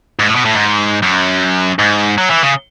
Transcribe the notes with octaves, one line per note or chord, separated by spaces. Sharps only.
G#2
A2
B2
A2
G#2
F#2
G#2
F#3
E3
C#3